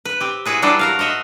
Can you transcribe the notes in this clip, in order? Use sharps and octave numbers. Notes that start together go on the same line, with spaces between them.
B4
C4 G4
E4 F#4 G#4 B4
F#3 G3 D4 E4 B4 C5
F#4 A#4 F5
F#4 C5 D#5 E5